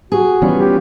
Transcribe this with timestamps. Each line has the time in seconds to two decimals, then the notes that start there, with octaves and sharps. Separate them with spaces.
0.12 F#4 G#4
0.42 E3 F3 G3 B3 C#4 F4
0.60 G4